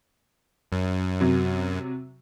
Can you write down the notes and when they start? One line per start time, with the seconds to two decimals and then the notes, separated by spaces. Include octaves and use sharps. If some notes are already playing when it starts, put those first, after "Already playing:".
0.72 F#2
1.21 C3 F#3